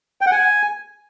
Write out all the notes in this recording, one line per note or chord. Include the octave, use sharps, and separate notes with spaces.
G5
F#5
G#5